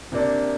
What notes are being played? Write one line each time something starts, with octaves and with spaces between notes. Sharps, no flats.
C3 A#3 D4